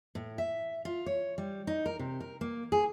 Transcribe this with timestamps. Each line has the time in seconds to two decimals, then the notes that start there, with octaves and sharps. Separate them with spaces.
0.15 A2
0.38 E5
0.85 F4
1.06 C#5
1.38 G3
1.67 D#4
1.86 A#4
1.99 C3
2.20 A#4
2.41 A#3
2.72 G#4